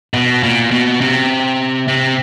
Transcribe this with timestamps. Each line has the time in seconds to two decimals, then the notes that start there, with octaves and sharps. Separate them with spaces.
0.14 B2
0.43 A#2
0.71 B2
1.01 C3
1.88 C3